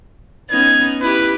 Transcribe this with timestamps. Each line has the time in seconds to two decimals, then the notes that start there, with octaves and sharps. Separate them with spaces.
0.50 B3 C#4 D#4 G#6
1.01 E4 G4 B4